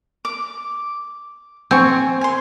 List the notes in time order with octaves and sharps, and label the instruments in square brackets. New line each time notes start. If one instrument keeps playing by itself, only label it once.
[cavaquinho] D6
[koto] C4 [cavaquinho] G#5 C#6
[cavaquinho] G#5 C6